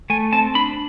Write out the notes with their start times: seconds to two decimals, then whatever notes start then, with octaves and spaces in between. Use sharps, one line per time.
0.10 A3 G#5
0.33 C4 A5
0.55 D4 B5